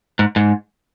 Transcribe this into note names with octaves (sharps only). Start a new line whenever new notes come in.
G#2
G#2